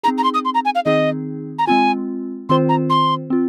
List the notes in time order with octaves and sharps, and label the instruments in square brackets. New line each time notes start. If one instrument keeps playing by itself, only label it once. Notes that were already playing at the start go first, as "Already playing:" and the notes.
[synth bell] C4 D#4 G#4 [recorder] A#5
[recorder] A#5
C6
D#6
C6
A#5
G#5
F5
[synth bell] D#3 C4 D#4 G#4 [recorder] D#5
[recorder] A#5
[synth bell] G#3 C4 F4 [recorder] G#5
[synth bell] D#3 C4 F4 C5 [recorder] C6
[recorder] A#5
C6
[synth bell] C4 F4